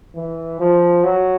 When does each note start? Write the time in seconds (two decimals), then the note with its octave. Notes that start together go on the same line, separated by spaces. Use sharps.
0.15 E3
0.60 F3
1.04 F#3